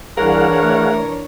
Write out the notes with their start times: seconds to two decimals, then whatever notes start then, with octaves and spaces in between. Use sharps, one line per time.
0.17 C2 E3 D4 G#4 A#4 C#5 F5 F#5
0.62 A3